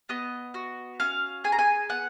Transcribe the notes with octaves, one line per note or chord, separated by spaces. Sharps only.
B3 D#5
F#4
C#4 F5
G#4 G#5
A#5
G#5
B3 F#5